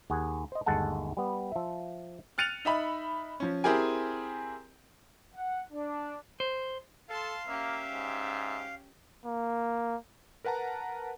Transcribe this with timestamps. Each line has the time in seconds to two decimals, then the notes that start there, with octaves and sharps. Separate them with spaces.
0.10 D#2 G#4 F#5
0.52 C5 D#5
0.66 G1 D#2 G#3 A4 F#5 A5
1.17 G3 B3
1.52 F3 E5
2.38 F6 F#6 A6 C#7 D#7 F7
2.65 D#4 E5 B5
3.40 F3 C#4
3.64 C4 E4 G4 G#4 A#4 G#5
5.34 F#5
5.72 D4
6.40 C5
7.09 A4 F5 A5 C6
7.48 A#3 C#4 G4 E5
7.91 G#2
9.25 A#3
10.44 A#4 B4 F#5 A5 A#5